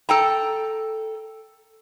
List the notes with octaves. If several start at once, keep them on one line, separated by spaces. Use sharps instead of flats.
A4 G5 A#5